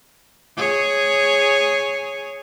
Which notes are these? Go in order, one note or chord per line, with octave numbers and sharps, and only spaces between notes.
G#4 C#5